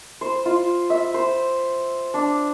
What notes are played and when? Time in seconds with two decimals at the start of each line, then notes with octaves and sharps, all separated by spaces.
0.21 C5
0.46 F4
0.90 E5
1.14 C5
2.14 D4